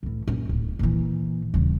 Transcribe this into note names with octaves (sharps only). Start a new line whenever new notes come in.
A2 E3
F#2 A#2
D1
A#2 E3
D#1 C#3